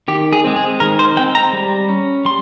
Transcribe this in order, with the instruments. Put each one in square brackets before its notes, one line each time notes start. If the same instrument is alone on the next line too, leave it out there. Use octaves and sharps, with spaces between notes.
[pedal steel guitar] D#3 G4
G#4
G#3 C4
G#4
D#3 A#4
C5
G#3 C4 G5
A#5
G3
C#4
G3 C6